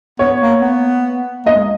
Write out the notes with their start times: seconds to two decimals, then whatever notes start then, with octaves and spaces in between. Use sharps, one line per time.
0.19 B3 C#5
0.41 A#3
0.62 B3
1.46 A#3 D#5
1.55 G#3